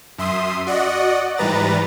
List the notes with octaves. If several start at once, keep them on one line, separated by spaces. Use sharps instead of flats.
F#2 E5 C6 D#6
F#4 D5 D#5 F#5
G#2 E3 G3 B4 A#5 A6